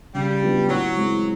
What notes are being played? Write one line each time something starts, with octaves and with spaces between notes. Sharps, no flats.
C#3 G3
F#3 B3 D4 F4
A2 F#3
E3 G#3 C4